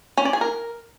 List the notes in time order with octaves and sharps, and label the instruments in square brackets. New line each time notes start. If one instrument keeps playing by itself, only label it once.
[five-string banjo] C#4
D5
G#4
A#4